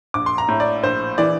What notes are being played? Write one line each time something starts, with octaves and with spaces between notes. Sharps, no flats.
A#1 D6
C6
A#5
A2
D5
A#1 C5
E3 D5